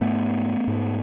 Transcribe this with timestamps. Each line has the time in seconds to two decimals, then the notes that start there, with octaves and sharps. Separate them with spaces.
0.01 G#2 A3 B3
0.68 G#2